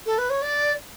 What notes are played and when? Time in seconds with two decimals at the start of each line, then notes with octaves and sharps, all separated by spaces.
0.06 A4
0.18 B4
0.30 C#5
0.42 D5